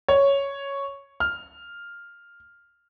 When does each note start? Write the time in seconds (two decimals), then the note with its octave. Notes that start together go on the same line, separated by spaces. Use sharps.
0.08 C#5
1.20 F6